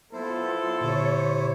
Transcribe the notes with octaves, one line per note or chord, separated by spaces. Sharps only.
F#3 B3 E4 F4 A4 C5
A#2 D3 G4 C#5